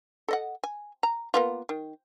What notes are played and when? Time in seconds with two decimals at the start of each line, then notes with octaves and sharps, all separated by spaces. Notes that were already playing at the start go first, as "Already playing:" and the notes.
0.28 A4 D#5 F#5
0.64 G#5
1.03 A#5
1.34 A#3 B3 F4
1.69 D#3